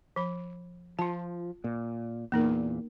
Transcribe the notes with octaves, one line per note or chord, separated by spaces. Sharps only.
F3 B5
F3 F4 A5
A#2
E2 A#2 A#3 D#4 A#4